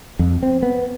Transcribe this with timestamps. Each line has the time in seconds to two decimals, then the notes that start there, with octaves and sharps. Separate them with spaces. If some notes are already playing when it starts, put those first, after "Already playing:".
0.19 F2
0.43 C4
0.63 B3